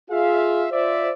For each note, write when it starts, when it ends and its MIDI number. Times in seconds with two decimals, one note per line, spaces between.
0.11 0.66 65
0.11 0.66 68
0.11 0.66 76
0.11 0.66 77
0.71 1.11 65
0.71 1.11 72
0.71 1.11 74
0.71 1.11 76